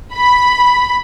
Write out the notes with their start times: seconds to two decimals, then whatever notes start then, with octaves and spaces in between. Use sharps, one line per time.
0.14 B5